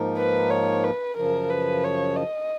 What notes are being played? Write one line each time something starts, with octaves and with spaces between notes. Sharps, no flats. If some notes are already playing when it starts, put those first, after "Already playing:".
Already playing: G#2 F3 A#3 D#4 A#4
B4
C#5
B4
F#2 C#3 F3 A#4
B4
C#5
D#5